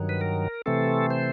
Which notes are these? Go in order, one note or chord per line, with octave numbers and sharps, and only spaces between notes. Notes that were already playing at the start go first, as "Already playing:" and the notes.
Already playing: G2 D#3 F#3
B4
A#4
C3 E3 A3 C4 A4
C5